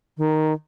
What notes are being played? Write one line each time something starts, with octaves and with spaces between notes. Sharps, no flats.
D#3